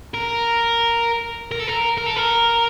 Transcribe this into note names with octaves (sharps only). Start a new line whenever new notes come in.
A#4
A#4
A4
A#4
A#4
A4
A#4